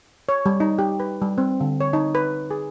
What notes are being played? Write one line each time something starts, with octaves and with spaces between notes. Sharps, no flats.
C#5
G3
D#4
G4
B4
G3
C4
D3
C#5
D#4
B4
G#4